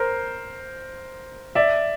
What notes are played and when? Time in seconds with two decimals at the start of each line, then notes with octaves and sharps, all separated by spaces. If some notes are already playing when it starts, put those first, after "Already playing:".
Already playing: A#4 C5
1.55 D5 E5